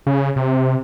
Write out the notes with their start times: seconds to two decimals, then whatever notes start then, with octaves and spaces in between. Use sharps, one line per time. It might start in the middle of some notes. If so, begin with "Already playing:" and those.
0.07 C#3
0.36 C3